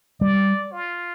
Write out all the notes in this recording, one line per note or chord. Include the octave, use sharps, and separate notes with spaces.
G3 D5
F4